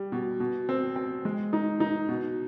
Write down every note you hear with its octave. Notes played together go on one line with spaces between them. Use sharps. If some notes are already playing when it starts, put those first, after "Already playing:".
Already playing: G3
B2
B2
C4
C4
G#3
D#4
D#4
B2